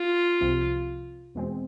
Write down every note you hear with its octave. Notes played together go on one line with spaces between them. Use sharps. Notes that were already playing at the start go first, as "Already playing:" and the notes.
Already playing: F4
C2 C3 F3
E2 B2 G#3 C4